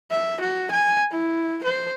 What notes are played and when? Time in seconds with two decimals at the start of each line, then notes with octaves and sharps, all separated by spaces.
0.11 E5
0.41 F#4
0.71 G#5
1.11 E4
1.64 C5